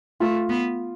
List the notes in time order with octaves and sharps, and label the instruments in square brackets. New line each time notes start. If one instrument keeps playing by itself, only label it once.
[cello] A3 [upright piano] F4
[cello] B3